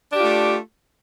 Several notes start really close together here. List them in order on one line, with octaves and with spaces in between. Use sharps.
D4 G4 F4 A3